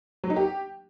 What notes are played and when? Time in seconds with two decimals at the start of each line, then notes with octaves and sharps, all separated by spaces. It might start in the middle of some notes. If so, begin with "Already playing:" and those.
0.24 F#3
0.30 D#4
0.36 G4